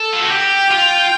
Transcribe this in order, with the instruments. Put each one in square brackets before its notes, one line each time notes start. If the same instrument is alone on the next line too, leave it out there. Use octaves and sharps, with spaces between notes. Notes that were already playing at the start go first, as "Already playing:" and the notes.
Already playing: [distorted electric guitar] A4
F4
F#4
[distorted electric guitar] G4 [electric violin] G5
[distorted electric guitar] F4